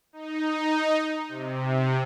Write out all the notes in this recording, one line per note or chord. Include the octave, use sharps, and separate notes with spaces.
D#4
C3